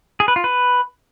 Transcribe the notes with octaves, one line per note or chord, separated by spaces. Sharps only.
G#4
B4
F4
B4